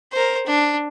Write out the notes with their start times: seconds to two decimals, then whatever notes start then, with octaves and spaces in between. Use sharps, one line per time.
0.13 A#4 C5
0.46 D4